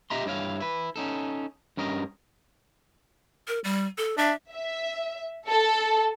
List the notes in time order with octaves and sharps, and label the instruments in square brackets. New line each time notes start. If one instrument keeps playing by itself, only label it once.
[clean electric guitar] G4 D#5 E5 A#5 C6
G2 E4 C#5 F5
E4 B4
C#4 D#4 A4
G2 C#4 A#4 D#5
[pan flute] A#4
G3
A4
[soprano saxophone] D4 [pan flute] E5
[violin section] E5
A4